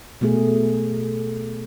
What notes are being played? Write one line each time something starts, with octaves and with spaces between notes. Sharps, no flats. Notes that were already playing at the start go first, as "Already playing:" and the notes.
B2 A3 G#4